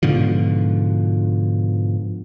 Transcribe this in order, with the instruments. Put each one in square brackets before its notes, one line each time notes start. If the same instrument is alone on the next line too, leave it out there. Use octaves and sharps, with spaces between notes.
[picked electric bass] G#2 B2 D3 F3